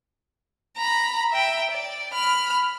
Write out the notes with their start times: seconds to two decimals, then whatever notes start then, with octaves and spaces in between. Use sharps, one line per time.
0.77 A#5 B5
1.31 E5 G5
1.71 D5
2.13 B5 F6